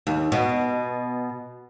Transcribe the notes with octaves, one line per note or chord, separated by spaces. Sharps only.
D#2
B2